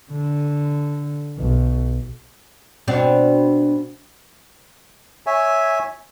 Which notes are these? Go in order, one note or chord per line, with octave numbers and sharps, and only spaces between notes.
D3
B1
B2 C4 D4
C#5 E5 G#5